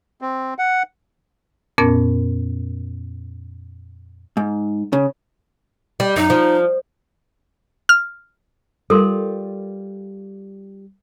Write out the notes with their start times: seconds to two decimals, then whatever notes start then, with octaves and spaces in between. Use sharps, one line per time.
0.21 C4
0.59 F#5
1.78 F2 A#2 B3 C#4 A#4 A6
4.37 G#2
4.93 C#3
6.00 G3
6.16 F#2 D#4
6.30 F3
7.89 F6
8.90 G3 F4 A4 A#4 C6